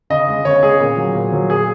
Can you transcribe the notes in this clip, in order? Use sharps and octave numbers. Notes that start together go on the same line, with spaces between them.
C#3 D#5
G#3
C#3 C#5
G#3 G#4
A#2
F#3
A#2
F#3
A#2 G#4